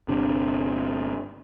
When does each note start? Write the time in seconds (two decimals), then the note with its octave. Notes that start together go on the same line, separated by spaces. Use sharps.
0.08 G1 C3 D4